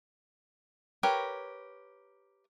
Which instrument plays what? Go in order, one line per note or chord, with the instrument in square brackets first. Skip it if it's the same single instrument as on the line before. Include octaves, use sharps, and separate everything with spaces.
[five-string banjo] G4 A#4 B4 C#5